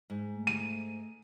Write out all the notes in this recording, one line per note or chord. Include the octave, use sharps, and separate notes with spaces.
G#2
A3
D#7